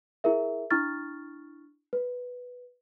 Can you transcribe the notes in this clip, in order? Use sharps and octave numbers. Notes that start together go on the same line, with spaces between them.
E4 G#4 A#4 E5
D4 E4 C#6 F6 A6
B4